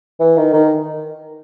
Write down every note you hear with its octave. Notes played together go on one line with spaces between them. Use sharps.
E3
D#3
D#3